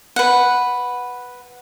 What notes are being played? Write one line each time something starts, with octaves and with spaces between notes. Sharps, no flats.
B4 F#5